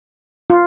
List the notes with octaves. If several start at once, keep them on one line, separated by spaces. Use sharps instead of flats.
F4